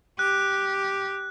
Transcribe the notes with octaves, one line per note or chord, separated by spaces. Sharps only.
G4 F#6